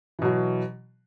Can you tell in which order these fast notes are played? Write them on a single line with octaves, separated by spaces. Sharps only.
E3 B2 F#3